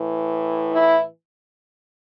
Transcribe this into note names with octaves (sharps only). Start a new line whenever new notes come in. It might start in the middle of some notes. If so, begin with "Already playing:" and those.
Already playing: A2 E3
E4